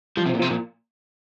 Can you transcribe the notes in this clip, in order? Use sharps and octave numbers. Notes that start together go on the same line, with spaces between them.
F3 G3
C3
F3
A#2
C3 F3
A#2 F3